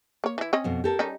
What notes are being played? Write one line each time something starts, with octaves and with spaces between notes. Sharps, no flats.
A#3 C#5
E3 E4
C4 C#4 D#5
F2 B2
G4 A4 A#4
G3 C#4 D#4